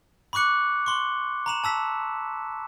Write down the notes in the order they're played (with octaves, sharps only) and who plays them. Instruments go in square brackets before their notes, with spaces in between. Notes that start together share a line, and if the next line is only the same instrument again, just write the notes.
[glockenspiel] B5 C#6 D6 F#6 C#7
C6 C#6
A#5 B5 E7
A5 E6 B6